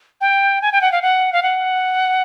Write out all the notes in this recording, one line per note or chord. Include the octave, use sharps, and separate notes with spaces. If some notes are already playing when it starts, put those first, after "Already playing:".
G5
G#5
G5
F#5
F5
F#5
F5
F#5